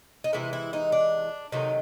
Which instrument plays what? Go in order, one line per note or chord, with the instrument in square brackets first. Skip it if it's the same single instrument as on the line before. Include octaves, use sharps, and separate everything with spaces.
[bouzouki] D#4
C3 E3 G#3 E4
E4
D#4
D4
C3 D#3 F#3 A3 D#4